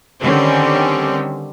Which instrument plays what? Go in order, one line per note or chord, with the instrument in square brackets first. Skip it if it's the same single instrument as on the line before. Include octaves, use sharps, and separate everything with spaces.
[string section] D3 D#3 G3 C4 C#4